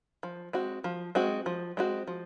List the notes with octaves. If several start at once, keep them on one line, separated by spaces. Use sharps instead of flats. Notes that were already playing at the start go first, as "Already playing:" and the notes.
F3
G#3 C4 F#4
F3
G#3 C4 F#4
F3
G#3 C4 F#4
F3